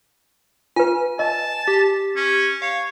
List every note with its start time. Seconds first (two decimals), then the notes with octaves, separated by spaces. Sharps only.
0.76 F4 B4 G#5
1.19 D#5 A5
1.68 G4
2.16 C#4
2.62 C#5 F5